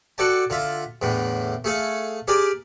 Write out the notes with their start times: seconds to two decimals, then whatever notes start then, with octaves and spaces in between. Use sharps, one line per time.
0.18 F#4 A4 D5 G5 A5
0.50 D3 F4 E5
1.02 E2 A2 D3
1.64 A3 G#4 A4 F5
2.28 G4 G#4 A#4 D5